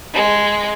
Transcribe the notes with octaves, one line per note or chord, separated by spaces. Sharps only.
G#3